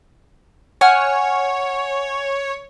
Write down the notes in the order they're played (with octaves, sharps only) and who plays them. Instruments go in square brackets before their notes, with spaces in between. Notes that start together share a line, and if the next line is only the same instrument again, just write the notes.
[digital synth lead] C#5 [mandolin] F#5 G#5 F6